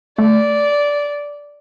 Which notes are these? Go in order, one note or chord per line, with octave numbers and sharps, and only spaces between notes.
A3 D5